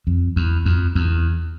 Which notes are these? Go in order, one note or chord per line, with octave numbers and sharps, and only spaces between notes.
F2
E2
F2
E2